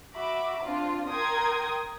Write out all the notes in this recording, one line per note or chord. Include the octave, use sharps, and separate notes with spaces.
F#4 E5 B5 D6
C4 D4 F4
A#4 G5 C6 D#6 G#6